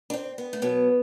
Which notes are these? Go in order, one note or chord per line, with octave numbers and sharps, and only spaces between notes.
D4
C4
B3
A3
B2 F#3 B3